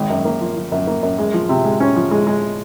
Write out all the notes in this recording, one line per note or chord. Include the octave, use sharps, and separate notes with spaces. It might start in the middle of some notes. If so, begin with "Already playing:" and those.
Already playing: G#1
F#2
A#3
F3
F3
F#2
A#3
F#2
G#3
F3
C3
G#3
C#4
F3
G#3
G#3